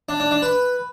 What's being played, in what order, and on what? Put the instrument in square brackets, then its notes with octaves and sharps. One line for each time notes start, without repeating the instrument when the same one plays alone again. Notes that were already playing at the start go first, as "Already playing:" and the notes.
[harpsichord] D4
D4
D4
B4